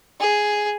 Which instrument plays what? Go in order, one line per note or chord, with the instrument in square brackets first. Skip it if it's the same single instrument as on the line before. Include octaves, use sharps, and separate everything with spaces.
[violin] G#4